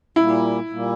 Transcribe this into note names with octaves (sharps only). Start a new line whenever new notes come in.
A#2 G3 A#3 E4
A#2 G3 A#3